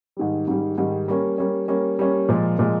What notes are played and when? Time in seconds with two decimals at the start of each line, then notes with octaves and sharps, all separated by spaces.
0.17 G#2 D#3 G3
0.48 G#2 D#3 G3
0.78 G#2 D#3 G3
1.08 G3 A#3 C#4
1.38 G3 A#3 C#4
1.68 G3 A#3 C#4
1.99 G3 A#3 C#4
2.29 A#2 F3 G#3
2.59 A#2 F3 G#3